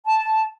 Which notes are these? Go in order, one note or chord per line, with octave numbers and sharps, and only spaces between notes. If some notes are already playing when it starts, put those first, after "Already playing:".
A5